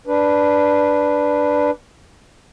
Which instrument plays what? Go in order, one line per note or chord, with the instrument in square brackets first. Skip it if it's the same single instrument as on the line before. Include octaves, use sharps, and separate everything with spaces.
[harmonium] D4 B4